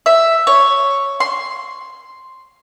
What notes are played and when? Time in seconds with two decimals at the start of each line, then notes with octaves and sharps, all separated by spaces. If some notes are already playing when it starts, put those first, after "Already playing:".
0.06 E5
0.47 C#5
1.20 C6